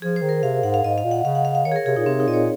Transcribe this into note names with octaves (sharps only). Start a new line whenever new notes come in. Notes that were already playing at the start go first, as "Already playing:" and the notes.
F3 G#4
C5
D#3
A#4
C3 F5
G#2 F#5
F5
G#2 D#5
F5
A#2
F#5
C#3 F5
F#5
F5
F5
D#3 C#5
G#4
A#4
C3 G#4
A#2 D#4
C3 C4
D#4
A#2 D#5
C#5